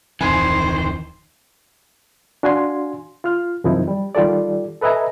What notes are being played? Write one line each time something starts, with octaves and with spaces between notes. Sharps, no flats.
D1 F2 D#3 E3 C5 G#5
D4 F#4 F5 G#5 C6
F4 F6
F#2 C3 D#3 F3 D#4 E4
G3
D#3 G3 F4 G4 A4 D5
A4 B4 D#5 E5 G#5 A#5